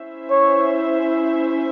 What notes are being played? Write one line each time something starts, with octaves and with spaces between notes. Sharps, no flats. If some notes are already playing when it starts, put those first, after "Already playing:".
Already playing: C#4 E4 C5 E5
C#5